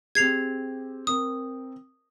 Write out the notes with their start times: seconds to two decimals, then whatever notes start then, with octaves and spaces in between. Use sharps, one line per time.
0.15 C4 G4 G#4 G#6 C7 F7
1.07 C4 A#4 D#6